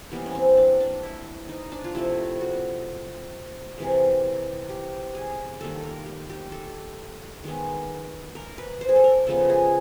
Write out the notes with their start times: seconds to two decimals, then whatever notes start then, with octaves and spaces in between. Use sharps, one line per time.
0.12 E3 G3 A#3 B3
0.26 C#4
0.35 C4
0.57 D4
0.80 D4
1.03 E4
1.49 D#4
1.72 D4
1.84 F4
1.95 C3 F3 A3 E4
2.41 F#4
3.78 C3 E3 G#3
4.69 G4
5.15 G#4
5.61 D#3 G3 A#3 A4
5.78 A4
5.83 A#4
6.06 G4
6.30 G4
6.52 A4
7.44 D#3 G#3 B3
8.35 A#4
8.58 B4
8.81 C5
8.89 G#4
8.96 A4
9.04 A#4
9.27 C#3 F3 G#3 B3 A4
9.50 G#4